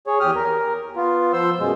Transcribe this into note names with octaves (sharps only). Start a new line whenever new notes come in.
G#4 C#5
E2 G4 D#6 F6
A#4
B3 F4
F3 C5 C6 E6
F#2 B2 G#3